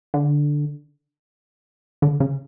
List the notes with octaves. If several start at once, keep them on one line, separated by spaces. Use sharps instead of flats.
D3
D3
C#3